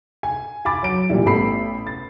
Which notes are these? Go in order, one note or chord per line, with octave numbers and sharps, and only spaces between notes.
G#5
G#5 B5 D6 A6
F#3 D7
A#2 E3 G3 E4
A1 B3 A4 B5 C7
A6